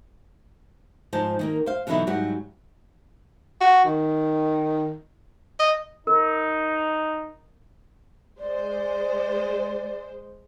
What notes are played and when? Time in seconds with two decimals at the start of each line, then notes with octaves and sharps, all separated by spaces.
1.13 G#2 F3 D#4 C5 A5
1.39 D#3 A#3 A#4
1.66 C5 F5
1.87 B2 D3 E3 F#3 D#4 E4
2.07 G#2 F#3 G3 F#4
3.61 F#4
3.85 D#3
5.60 D#5
6.07 D#4 A#4
8.39 G#3 C5 D5